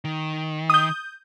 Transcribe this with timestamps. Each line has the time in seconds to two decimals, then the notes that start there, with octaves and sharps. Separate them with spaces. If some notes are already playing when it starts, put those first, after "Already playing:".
0.05 D#3
0.70 D#6 G6